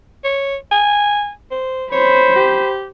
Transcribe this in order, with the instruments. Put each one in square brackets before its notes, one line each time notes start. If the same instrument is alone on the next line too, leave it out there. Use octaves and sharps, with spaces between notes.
[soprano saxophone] C#5
G#5
C5
[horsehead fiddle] C5 B5 [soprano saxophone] C#5
[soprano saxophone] G4